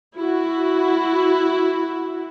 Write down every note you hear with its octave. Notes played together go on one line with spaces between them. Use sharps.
E4 F#4